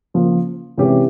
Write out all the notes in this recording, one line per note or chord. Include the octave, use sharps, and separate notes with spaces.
C#3 F3 A#3
C3 E3 G#3 C#4 G4